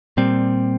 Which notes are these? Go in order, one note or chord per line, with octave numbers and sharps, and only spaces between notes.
A#2 G3 C4